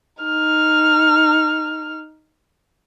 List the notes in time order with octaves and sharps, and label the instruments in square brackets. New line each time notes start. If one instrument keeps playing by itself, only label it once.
[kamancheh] D#4 F6